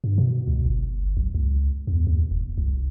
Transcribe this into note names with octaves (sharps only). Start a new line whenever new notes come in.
G2
B2
C#2
G1
B1
C#2
E2
D#2
E1
C2